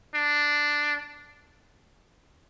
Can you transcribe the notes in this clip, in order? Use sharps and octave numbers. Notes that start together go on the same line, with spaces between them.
D4